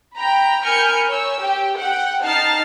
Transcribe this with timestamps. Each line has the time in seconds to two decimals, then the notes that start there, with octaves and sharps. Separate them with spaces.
0.16 G5 A#5 B5
0.63 A#4 G#5 B5 F6 G6 C#7
1.08 C#5 E6
1.40 G4 G5
1.77 F#5 G5
2.23 D#4 A5 F6 A6 C7